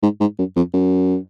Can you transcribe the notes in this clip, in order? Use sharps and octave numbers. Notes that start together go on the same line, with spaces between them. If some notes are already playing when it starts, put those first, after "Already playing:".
G#2
G#2
F#2
F2
F#2